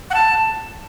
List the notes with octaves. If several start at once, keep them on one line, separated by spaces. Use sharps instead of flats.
F#5
A5